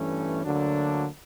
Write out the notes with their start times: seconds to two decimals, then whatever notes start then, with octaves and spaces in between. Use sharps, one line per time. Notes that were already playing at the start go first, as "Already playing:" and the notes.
Already playing: G2 E3 A3 C#4
0.44 D2 D3 F#3 A#3 D4